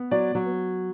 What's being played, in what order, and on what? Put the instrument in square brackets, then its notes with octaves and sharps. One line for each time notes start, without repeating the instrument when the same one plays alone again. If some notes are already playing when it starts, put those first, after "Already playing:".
Already playing: [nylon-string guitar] B3
[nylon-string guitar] F#3 [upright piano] D5
[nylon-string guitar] F#3